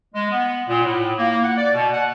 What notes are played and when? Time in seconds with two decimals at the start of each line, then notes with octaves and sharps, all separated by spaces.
0.15 G#3
0.31 B3
0.69 A#2
0.84 A2
1.18 A#3
1.44 F#5
1.57 D5
1.74 B2
1.93 F#5